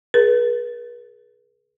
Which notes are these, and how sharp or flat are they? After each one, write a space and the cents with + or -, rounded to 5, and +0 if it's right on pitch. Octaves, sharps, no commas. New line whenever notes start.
G#4 +15 B4 -45